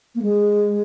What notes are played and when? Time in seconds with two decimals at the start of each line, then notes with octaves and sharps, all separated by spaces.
0.15 A#3
0.22 G#3